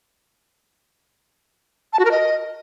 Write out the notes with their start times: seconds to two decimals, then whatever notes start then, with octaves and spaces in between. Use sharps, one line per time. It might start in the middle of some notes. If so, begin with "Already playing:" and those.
1.93 A5
1.99 F#4
2.05 A#4
2.11 D#5